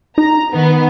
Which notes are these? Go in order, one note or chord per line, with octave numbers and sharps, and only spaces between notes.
D#4 A#5
D#3 B3